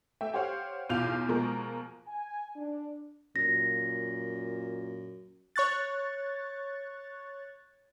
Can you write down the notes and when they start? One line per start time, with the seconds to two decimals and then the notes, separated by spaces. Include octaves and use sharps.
0.21 A3 E5 G5
0.34 G4 C5 C#5 F5 F#5
0.90 B1 E2 F4 F5 G6 F7
1.28 B2 F3 G#3 A#3 A#4
2.07 G#5
2.56 D4
3.36 F#2 A#2 A#6
5.56 C#5 C#6 F#6 A6